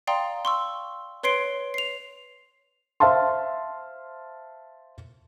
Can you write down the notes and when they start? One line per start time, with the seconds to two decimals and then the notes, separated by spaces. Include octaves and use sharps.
0.07 D5 F5 G5 A#5 C6 D#6
0.45 C6 C#6 E6
1.23 B4 C#5 C6 C7 D7 G7
1.74 C7 F7
3.00 C5 E5 F5 A5 C6